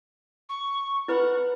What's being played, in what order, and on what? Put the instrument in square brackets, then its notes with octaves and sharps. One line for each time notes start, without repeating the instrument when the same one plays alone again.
[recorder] C#6
[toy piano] E4 B4 B5 [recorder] F#5